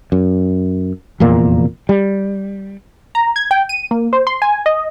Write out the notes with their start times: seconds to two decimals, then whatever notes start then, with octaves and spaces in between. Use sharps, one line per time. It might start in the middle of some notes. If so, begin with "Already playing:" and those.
0.12 F#2
1.20 F1 E2 A#2 A#3
1.89 G3
3.15 A#5
3.36 G#6
3.51 G5
3.69 D#7
3.91 A#3
4.13 C5
4.27 C6
4.42 G#5
4.66 D#5